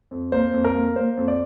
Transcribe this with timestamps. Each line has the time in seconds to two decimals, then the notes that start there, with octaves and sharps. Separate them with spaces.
0.11 F2
0.32 A#3 C5
0.53 F2
0.64 A#4
0.75 A#3
0.96 A#3 C5
1.17 F2
1.28 D5